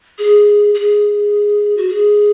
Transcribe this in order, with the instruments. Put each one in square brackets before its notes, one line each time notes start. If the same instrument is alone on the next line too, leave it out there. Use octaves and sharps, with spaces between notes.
[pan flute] G#4
G#4
F#4
G#4